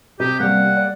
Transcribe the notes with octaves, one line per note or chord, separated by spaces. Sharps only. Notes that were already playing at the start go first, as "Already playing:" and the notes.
C3 G4 D#5
G3 A#3 F#5
D5